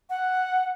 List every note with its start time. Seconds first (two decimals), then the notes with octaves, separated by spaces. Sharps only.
0.10 F#5